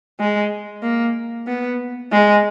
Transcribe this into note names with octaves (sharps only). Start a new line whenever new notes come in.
G#3
A#3
B3
G#3